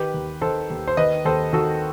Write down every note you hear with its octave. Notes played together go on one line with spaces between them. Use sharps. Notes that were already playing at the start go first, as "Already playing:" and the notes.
Already playing: D#3 G4 B4
D#2
D#3 A4 C5
D#2
C5
D#3 B4 D#5
D#2 A4 C5
D#3 F#4 A4